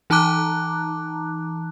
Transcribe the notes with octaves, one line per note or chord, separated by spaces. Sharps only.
E3 D#4 A5 A#5 D6 F#6